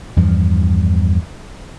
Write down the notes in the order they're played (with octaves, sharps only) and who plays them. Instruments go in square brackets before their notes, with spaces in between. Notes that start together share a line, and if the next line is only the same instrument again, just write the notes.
[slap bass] E2 G2 F3